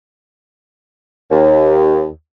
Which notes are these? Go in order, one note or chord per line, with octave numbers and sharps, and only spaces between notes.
D#2